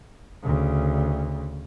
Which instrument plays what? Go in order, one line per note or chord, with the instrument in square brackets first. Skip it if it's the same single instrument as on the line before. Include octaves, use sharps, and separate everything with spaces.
[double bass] D2 C#3